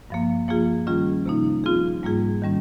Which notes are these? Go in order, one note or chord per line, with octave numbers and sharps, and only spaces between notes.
G2 F3 A#3
F3 A#3 F4 G#4
D#3 G3 C#4 F4 G#4
C3 F3 A#3 D#4
F3 C4 F4 G#4
G#2 G3 A#3 F4 G#4
D#3 G3 C#4